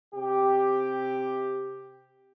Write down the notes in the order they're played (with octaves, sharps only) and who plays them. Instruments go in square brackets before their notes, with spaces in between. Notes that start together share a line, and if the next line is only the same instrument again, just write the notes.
[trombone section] C3 G4